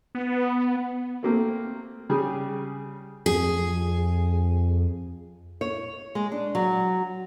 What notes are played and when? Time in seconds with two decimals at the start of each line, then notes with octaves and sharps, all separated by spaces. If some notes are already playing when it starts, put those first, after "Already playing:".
0.15 B3
1.23 A3 A#3 C4
2.09 C#3 G3 G#4
3.26 F2 G#4
5.61 C#5
6.15 G#3
6.32 D4
6.55 F#3